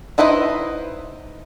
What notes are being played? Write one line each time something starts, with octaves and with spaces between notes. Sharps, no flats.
D#4 E4 B4 C5 D#5